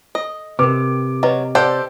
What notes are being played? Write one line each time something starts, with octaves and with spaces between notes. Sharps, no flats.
A4 D#5
C3 A#4 B4 D6
F#3 B4 D#5
G4 A4 C5 D5 F#5